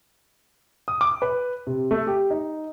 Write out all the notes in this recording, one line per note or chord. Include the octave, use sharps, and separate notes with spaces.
D#6
D6
B4
C3
A3
G4
D#4